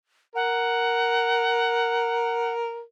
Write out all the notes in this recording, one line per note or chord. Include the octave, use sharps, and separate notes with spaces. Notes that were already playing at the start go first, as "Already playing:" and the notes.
A#4 F#5